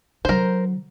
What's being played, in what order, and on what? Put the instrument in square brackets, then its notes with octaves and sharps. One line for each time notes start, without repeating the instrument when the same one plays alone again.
[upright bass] D3 F#3 [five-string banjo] A#4 C5